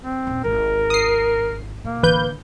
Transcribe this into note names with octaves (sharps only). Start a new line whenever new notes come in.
C4
D#1
G#1 A#4
D#6 C7
B2 A#3
A1 D3 B4 G6